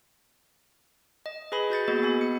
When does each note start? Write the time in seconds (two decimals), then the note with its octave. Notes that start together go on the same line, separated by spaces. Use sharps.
1.26 D#5
1.52 G#4 B4 G#5 B5
1.70 F#4 G6 A6 C#7
1.88 A#3 B3 F#4 G#4 D#5
2.03 B3 G#5 B5
2.21 C#7